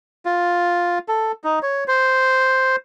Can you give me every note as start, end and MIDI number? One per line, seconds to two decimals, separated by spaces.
0.25 0.98 65
1.08 1.32 69
1.44 1.59 63
1.62 1.84 73
1.88 2.76 72